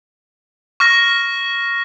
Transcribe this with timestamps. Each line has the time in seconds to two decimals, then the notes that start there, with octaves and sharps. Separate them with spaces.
0.80 C#6 F6 A#6